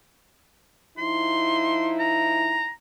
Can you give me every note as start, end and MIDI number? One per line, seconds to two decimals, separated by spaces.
0.98 2.70 53
0.98 2.70 63
0.98 2.70 64
0.98 1.91 84
1.99 2.70 82